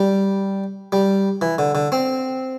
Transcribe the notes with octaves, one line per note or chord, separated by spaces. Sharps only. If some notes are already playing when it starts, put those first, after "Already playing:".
Already playing: G3
G3
E3
D3
D3
C4